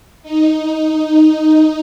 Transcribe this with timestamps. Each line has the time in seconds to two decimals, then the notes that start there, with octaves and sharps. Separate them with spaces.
0.23 D#4